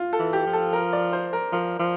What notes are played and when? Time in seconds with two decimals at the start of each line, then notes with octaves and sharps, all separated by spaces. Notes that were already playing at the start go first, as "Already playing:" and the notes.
Already playing: F4
0.13 A4
0.19 E3
0.33 G4
0.47 F3
0.53 A4
0.73 A#4
0.93 D5
1.13 C5
1.33 A#4
1.52 F3 A#4
1.79 F3